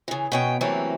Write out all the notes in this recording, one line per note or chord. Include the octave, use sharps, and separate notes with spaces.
C#3 E3
B2 C#4 G5
C3 E3 F#3 A3 A#3 C4